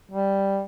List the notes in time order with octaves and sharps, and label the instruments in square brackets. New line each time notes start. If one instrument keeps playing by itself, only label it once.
[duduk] G3